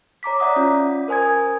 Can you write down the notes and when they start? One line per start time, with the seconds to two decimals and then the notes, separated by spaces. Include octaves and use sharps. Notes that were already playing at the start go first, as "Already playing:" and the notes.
0.23 C#5 A#5 D6 B6
0.40 D5 E5 F#5 D#6
0.56 C#4 F4
1.08 A#4 C5 G#5 D#6 G#6